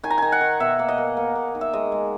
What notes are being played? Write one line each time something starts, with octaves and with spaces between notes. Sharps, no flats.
D#3 G#5
A#5
D#3 G#5
F#5
D#3
B2 E5
A#3
D#5
A#3
A#3
A#3
D#3
E5
G#3 D#5
G#3